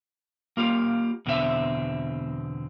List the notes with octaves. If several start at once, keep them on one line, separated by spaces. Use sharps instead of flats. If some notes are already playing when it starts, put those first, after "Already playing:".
A#3 F4 G4
E2 B2 D3 C4 E5